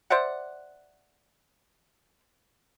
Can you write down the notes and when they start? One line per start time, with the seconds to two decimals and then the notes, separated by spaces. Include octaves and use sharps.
0.10 C5 D5 E5 F#5